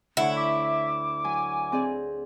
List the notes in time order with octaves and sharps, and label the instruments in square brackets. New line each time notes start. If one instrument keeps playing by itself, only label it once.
[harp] D2 D3 C#5 [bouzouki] E4 [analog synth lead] F#5
[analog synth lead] E5 [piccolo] D6
[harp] F#3 [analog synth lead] G#5
[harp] C4 G#4 D5